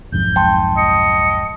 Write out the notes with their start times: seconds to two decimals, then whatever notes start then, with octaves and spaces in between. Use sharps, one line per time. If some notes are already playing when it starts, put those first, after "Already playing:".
0.12 B1 F2 G#2 G6
0.36 G5 A5 C6
0.77 D#5 C#7